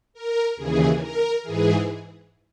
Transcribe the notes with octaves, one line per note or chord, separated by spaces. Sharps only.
A#4
D#2 C#3 E3 G#4
A#4
G#2 E3 G#4